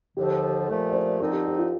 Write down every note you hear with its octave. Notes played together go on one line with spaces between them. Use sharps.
D#2 D3 F3 G4
A#2 F3 A3 A4
D5
C5
F2 D3 F3 C4 D#4 A#4
G4
G4
F4